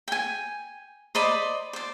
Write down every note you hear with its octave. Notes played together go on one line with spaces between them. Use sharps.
G5 G#5
C5 D5 D#5 B5
C5 D5